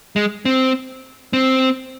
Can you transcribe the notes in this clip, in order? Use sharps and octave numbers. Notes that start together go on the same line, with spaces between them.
G#3
C4
C4